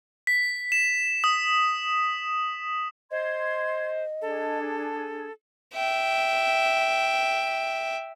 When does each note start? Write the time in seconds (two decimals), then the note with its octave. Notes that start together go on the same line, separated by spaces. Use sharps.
0.27 B6
0.72 E7
1.24 D#6
3.11 C5 D#5 C6 G#6
4.21 D4 G#4 A4
5.74 E5 G5